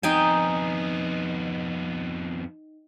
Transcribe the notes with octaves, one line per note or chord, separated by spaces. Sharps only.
F2 B3 D#4 G5 G#5